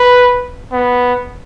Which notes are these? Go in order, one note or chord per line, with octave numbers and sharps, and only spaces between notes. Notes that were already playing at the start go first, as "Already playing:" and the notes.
Already playing: B4
B3